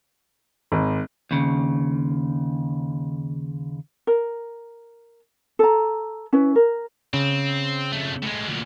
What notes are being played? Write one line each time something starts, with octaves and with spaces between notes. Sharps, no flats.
G#1
D#2 C#3
A#4
A4 A#5
C#4 E4 B4
A#4
C#3 C4
F2 A3
A2 G#3
D2 A#2